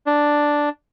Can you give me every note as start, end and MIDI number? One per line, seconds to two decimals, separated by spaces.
0.06 0.69 62